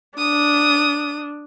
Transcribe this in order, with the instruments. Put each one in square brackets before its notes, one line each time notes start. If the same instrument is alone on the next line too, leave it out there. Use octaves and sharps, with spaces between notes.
[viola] D4 [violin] D#6